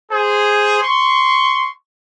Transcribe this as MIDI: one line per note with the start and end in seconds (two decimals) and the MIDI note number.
0.11 0.79 68
0.11 0.79 72
0.82 1.66 84
0.82 1.66 85